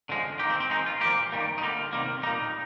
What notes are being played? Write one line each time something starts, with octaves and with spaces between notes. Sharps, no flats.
D3 F3 G#3
D#3 A#3 G4
C4
C4
D#3 G#3 D#4
F4
A#2 F3 A#3 G4
D#3 G3 A#3
D#4
D3 G3 A#3 F4
C3 D#3 G3 A#3
A#2 G3 A#3 D#4